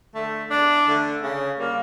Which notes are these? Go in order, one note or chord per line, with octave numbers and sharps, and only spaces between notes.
D3 A3
E2 D4
D3 A3
C#3
G3 A#3